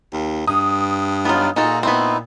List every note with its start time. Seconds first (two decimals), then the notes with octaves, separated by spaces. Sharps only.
0.13 D#2
0.47 G2 D#6
1.25 F#3 B3 D#4 F4
1.56 A#2 D#4 F4 F#4 G#4 A4 A#5
1.83 B3 C4 D#4 E4